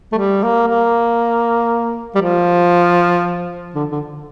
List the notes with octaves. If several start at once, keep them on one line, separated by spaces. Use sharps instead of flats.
A3
G3
A#3
A#3
G3
F3
D3
D3